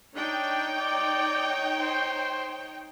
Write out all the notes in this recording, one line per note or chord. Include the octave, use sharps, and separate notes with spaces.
D4 D#4 C#5 G5
D5
C5